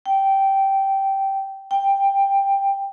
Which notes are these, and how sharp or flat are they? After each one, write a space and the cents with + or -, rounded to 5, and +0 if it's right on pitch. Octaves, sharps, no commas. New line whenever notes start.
G5 -10
G5 +10